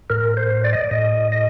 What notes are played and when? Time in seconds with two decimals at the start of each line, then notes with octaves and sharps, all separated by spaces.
0.10 A2 A#4
0.37 C5
0.64 D5
0.73 D#5
0.81 D5
0.91 A2 D#5
1.32 D#5